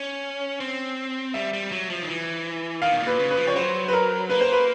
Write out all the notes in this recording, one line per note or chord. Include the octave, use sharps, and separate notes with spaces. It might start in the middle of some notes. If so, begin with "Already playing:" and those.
Already playing: C#4
C4
G3 E5
G3
F#3
F3
D#3
E3
D#3 F5
B2
A#2
B4
C#3
B4
F3
C#5
F#3 C5
B4
A#4
A#3 B4
C5
B4